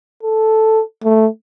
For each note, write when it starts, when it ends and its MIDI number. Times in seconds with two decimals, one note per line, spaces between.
0.23 0.81 69
1.04 1.27 57